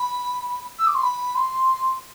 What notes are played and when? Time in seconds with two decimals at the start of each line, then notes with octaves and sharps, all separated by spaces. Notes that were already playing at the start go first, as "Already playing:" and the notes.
Already playing: B5
0.78 E6
0.86 D6
0.94 C6
1.02 B5
1.35 C6